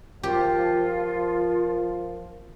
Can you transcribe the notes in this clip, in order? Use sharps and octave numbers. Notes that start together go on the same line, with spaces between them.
F3 F4 G4 A#4